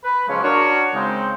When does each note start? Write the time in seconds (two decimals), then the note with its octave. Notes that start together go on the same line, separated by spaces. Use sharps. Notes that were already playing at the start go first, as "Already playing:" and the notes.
0.04 B4
0.28 C#3 F3 F#3 G#3 B3 C#4
0.43 D4 F#4 A#4 C#5
0.94 C#3 G#3 C4 D#4